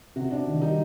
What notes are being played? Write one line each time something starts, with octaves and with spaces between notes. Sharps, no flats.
C3 F#4
D4
D#3
G3 D#4